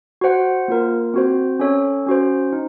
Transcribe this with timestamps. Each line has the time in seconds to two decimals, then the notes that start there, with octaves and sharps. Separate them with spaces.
0.21 F#4 C5 F#5
0.68 A#3 F4 A#4
1.14 C4 F#4 C5
1.60 C#4 A4 C#5
2.07 C#4 F#4 C5
2.53 D#4